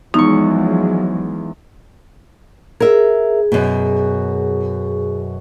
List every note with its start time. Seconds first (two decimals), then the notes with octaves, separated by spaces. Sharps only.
0.14 E2 F3 F#3 G#3 D#4 C#6
2.80 G#4 A#4 E5
3.52 F#2 B2